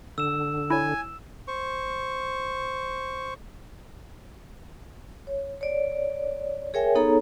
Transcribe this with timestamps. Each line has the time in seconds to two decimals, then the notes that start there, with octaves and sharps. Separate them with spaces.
0.18 D3 E6 E7
0.70 E4 C#5 G#5
1.48 C5 C#6
5.27 C#5
5.61 C#5 D5
6.74 G#4 A#4 C#5 E5 G5 G#5
6.95 B3 D#4 G#4 A4 C#5 A#5